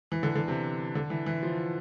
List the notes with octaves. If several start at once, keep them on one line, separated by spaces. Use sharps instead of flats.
E3
D3
D3
C3
D3
E3
E3
F3